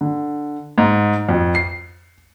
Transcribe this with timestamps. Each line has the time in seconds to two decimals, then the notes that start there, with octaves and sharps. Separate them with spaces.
0.01 D3
0.78 G#2
1.29 F2
1.55 C7